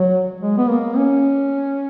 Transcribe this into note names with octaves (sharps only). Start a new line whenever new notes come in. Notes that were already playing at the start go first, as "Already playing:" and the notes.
Already playing: F#3
G#3
B3
A#3
C#4